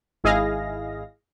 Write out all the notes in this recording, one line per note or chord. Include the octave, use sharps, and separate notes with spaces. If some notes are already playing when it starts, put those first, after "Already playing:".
G#1 E4 G#4 D#5 F5 A#6